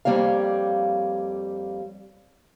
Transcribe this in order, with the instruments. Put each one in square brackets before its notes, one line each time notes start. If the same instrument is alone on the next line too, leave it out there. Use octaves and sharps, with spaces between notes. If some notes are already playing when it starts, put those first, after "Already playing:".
[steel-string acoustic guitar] F2 G3 A#3 C#5 F5